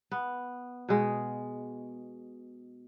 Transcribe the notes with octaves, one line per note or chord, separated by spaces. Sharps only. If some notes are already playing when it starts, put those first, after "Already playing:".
B3
B2 G#3